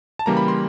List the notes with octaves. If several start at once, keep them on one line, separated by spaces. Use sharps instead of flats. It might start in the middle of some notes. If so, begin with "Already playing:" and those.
A5
C#3 E3 G3 A#3 A#5
B5
C6